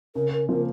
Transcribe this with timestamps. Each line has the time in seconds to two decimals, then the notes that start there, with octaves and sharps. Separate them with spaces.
0.15 C#3 A#4
0.32 A#4
0.49 F3 A#3 A#4